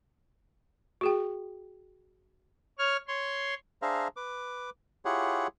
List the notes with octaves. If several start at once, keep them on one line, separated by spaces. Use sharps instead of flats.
F#4 G#4 G5
C#5 F6
C#5 C6
D4 G#4 C5 E5 F5 A#5
B4 D6
E4 F4 G4 G#4 C#5 F#5